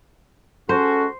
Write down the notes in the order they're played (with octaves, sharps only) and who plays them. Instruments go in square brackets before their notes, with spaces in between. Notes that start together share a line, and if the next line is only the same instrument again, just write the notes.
[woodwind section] G#3 C#4 F#4 [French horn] A4 [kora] C5